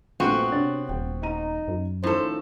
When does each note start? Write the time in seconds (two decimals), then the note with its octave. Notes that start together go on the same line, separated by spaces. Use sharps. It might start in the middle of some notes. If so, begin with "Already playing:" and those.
0.20 A#1 G2 A3 B3 C4 F#4
0.52 C3 D4 C#5 A6
0.89 D#1 G5
1.23 D#4 A#5 D#7
1.68 F#2
2.04 A2 D#3 F3 C#4 A4 C5